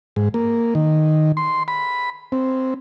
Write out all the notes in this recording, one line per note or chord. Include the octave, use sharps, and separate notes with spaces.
G#2
A#3
D#3
C6
B5
C4